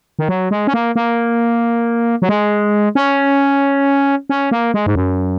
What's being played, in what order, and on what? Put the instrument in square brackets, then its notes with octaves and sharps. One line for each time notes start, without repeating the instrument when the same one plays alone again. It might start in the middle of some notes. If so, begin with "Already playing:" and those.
[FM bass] D#3
F#3
G#3
C#4
A#3
A#3
F#3
G#3
C#4
C#4
A#3
G#3
G#2
F#2